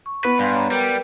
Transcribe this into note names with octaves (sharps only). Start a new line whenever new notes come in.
C#6
B3 B4
G2 F5 G#5 C6
C#5 A#5
G3 A#4 B4 G5